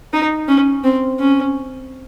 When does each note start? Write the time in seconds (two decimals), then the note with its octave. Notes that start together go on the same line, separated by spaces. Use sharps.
0.13 D#4
0.48 C#4
0.84 C4
1.20 C#4